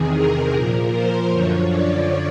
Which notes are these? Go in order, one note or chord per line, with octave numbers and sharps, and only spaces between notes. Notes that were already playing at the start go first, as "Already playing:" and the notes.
Already playing: E2 C3 D#3 G#4
A#4
A#2 F3
C5
F#2 D3 F3 C#5
D5